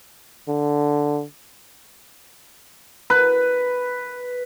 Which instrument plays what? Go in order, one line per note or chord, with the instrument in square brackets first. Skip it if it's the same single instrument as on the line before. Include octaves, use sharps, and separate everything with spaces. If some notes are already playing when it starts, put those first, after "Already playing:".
[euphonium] D3
[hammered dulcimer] B4